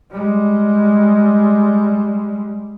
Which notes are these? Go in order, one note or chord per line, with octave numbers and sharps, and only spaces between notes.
G3 G#3